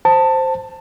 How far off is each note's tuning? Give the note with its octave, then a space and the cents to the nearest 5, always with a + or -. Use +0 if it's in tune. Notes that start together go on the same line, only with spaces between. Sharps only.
C5 +0 A5 +15